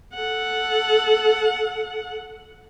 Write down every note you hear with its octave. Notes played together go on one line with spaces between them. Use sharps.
A4 F#5